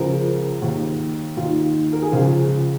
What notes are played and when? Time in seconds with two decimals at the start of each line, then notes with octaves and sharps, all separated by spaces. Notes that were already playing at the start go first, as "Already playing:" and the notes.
Already playing: C#2 C#3 F3 A#4
0.62 D#2 D#3
1.37 D#2 D#3 F4
1.93 A#4
2.02 G#4
2.12 C#2 C#3 F3 F4